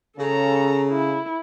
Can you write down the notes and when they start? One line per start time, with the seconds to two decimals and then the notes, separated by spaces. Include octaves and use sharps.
0.19 C#3 A4 A#5
0.90 E4